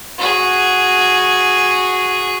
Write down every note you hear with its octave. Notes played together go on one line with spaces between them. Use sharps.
F#4 G#4